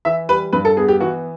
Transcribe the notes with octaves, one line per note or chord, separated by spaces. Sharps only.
E3 E5
G3 B4
G2 B4
A4
B3 G#4
G4
E3 F#4